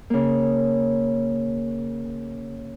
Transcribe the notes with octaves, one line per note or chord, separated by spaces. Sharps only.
C#3 A#3